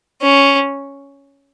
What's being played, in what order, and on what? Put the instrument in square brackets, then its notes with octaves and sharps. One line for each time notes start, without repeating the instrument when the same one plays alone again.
[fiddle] C#4